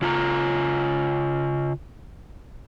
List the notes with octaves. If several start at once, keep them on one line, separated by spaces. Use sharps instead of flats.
C#3 F4 G#5 A#5